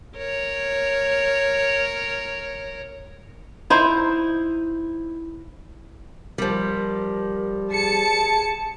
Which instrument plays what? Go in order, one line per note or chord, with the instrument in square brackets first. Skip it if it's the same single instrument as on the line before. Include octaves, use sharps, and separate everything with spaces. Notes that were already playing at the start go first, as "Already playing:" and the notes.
[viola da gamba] A#4 C#5
[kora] D#4 E4 C5
[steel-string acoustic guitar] F3 G3 [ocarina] A#4
[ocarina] G#4 [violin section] A5 C#7